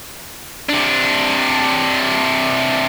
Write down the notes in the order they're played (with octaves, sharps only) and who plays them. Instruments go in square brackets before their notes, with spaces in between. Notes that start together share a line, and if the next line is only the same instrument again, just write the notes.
[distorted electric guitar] C3 D4